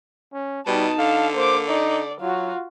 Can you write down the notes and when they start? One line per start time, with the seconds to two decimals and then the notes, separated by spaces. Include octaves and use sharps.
0.33 C#4
0.67 B2 G3 D#4 A5
0.98 D3 F5
1.36 A#3 C5 D6
1.68 D#4 D5
2.21 F#3 F4 F#4